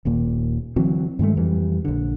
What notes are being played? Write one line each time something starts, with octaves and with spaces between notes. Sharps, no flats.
D#1 D#2 A#2
D3 E3 F#3 C4
G2 D#3 G#3 A3
F2 E3 G3
A#1 D3